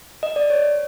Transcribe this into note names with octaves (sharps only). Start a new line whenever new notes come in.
D#5
D5
C#5